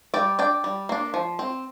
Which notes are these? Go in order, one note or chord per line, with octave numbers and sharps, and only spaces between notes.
G3 D5 G5
D4 D5 G5
G3
A#3 D4
F3
C4